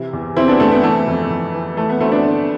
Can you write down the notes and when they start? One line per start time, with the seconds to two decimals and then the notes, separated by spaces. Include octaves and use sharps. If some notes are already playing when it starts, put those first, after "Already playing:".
Already playing: C3 E3 E4
0.13 E2
0.36 E2 C4 E4
0.48 B3 D4
0.60 E2 A3
0.72 B3
0.83 E3 A3
1.07 F2
1.30 F2
1.54 E3
1.77 E3 A3
1.89 B3
2.00 D2 A3 C4
2.12 B3 D4
2.24 D2